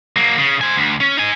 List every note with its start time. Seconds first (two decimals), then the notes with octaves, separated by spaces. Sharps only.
0.16 F#3 A#3
0.38 C#3
0.61 C5 G#5
0.76 D2
1.00 C#4
1.17 D#4 G#5